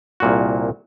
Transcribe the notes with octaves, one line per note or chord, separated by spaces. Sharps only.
C2 A#2 F#4